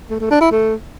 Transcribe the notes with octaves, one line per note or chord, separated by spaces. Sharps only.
A3
A3
D4
E4
A3